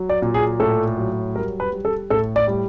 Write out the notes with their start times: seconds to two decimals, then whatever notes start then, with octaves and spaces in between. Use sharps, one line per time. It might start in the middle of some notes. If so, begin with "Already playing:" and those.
Already playing: F#3
0.09 D5
0.22 A#2
0.34 G#4
0.60 A2 A4
0.97 F#3
1.35 G3 A#4
1.60 B4
1.72 G3
1.85 A4
2.10 A2 A4
2.36 D5
2.48 G3